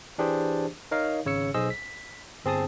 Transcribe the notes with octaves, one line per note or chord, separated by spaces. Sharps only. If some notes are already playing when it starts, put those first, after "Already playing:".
E3 D4 G4 G#4 C5
D#4 A#4 C#5 D#5 F5
G#1 C#3 C#5 E6 C#7
B1 G#4 C5 D#5 E6
B6
G1 C4 G#4 A5 D#6